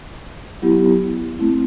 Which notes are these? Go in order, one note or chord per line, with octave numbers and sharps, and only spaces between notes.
F#3 B3 E4 G4
A3 C4 E4